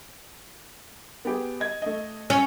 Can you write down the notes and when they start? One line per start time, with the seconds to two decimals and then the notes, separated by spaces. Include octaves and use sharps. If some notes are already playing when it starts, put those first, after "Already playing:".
1.25 B3 G4 G#4
1.60 D#5 G#6
1.82 A3 D#5
2.30 C#4